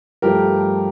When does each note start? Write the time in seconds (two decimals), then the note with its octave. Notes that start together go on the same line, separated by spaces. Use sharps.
0.22 G2 F3 A3 G4 A#4